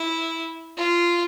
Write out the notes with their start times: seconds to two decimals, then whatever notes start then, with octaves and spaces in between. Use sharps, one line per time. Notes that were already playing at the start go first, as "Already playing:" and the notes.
Already playing: E4
0.77 F4